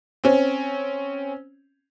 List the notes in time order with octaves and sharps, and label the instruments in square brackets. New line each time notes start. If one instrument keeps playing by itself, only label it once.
[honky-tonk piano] C4 C#4